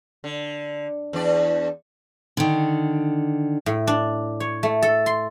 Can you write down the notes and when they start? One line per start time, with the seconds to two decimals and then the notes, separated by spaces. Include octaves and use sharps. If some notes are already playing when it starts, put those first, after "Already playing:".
0.24 D3
1.13 E2 D4 D5
2.37 D3 D#3
3.66 A2
3.87 D4
4.40 C#5
4.63 A3
4.82 A4
5.06 C6